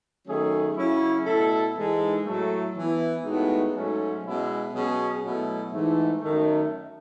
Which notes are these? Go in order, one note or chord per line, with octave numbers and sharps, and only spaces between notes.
D#3 F#3 A3 C#4 G#4
C#3 F#3 C#4 E4
B2 A3 E4 A4
G#2 E3 G#3 D#4 A4
A2 F#3 A3
E3 B3 E4
A2 G#3 B3 D#4 F#4
G#2 F#3 A3 C#4
B2 G#3 C#4 E4
B2 F#3 C#4 G#4
B2 F#3 A3 E4
G#2 E3 A3
F#2 D#3 A3